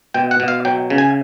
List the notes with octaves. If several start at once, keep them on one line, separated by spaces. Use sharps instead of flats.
B2 G5
F#5
B2
F5
F#3 G5
C#3
G#5